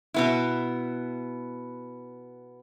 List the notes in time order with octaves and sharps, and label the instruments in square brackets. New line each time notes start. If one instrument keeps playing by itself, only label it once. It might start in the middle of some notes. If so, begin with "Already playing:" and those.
[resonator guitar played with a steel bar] B2 B3 E4